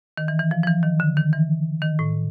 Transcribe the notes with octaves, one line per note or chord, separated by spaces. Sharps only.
D#3
E3
E3
F3
F3
E3
D#3
D3
D#3
E3
D#3
A2